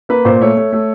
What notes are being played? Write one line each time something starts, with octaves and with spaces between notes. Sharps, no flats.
A#3 B4
A#2 C5
A3 C#5
A3
A3